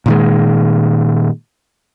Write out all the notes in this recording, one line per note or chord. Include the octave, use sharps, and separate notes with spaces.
A#2 D#3 G#3